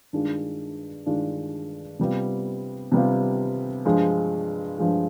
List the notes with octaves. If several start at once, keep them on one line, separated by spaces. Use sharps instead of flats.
G2 D#3 G#3 D4 F4
G2 D#3 G#3 D4 F4
C3 G3 B3 F4
C3 G3 B3 F4
G2 F3 G#3
G2 F3 G#3